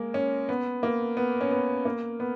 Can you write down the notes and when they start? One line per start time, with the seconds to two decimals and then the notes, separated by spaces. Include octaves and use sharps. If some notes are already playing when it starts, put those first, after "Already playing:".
Already playing: G#3 A#3
0.14 C#4
0.49 B3
0.83 A#3
1.17 B3
1.41 C#4
1.51 B3
1.85 A#3
2.20 B3